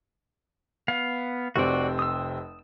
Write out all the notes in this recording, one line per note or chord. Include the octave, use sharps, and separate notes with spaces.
B3 F5
F1 C3 C4 F#4 D5
D#6 E6